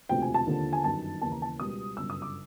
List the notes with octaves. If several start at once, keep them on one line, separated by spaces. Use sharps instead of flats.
E1 D2 C3 F3 G5
G#5
A5
D#2 D3 F3
G#5
G1 F#2 D#3 A5
D#2 C#3 E3 A5
A#5
A5
C#2 B2 G3 D#6
G1 F#2 C#3 E6
D#6
D6